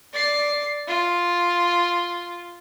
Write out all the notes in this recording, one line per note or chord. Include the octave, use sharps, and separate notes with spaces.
D5 C7
F4